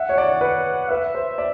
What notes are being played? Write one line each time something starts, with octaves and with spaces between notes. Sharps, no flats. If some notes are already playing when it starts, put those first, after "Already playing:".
Already playing: E5 F#5
C#5
D5
B4
B4 E5
C5
D5